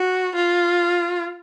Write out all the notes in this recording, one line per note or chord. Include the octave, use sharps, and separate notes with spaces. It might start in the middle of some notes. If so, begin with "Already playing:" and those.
Already playing: F#4
F4